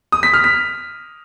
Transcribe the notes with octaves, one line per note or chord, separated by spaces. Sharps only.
D#6
B6
F6
B6